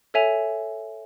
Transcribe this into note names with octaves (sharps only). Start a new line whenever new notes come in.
A4 C#5 E5 G#5 F7